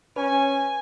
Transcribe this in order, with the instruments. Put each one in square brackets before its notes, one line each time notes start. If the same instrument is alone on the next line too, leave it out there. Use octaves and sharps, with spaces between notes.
[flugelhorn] C#4 [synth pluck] B4 [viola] G#5